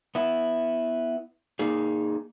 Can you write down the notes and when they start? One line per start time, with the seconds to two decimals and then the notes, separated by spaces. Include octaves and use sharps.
0.15 B3 E4
1.59 A#3 D#4 G#4